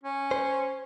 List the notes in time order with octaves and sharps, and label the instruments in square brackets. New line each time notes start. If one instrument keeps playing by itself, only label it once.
[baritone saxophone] C#4
[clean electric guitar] C5